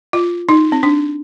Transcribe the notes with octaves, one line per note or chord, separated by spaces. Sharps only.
F4
D#4
C4
D4